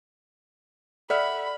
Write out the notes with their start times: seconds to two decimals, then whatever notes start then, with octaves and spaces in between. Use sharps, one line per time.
1.10 A4 D5 E5 F#5 B5 F6